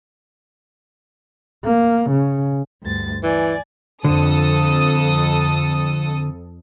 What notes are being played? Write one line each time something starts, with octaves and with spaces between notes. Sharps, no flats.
A#3
C#3
D2 G2 A6
E3 D5 G#5
F2 D3 A4 D#6